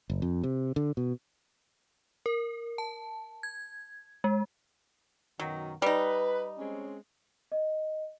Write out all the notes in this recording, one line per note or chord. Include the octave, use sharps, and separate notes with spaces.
F#1
F2
C3
D3
B2
A#4
A5
G#6
G#3
F#2 B2 D#3 F#3
G3 D#4 B4
G#3 C4 C#4
D#5